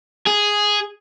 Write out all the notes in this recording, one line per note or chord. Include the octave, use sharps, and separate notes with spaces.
G#4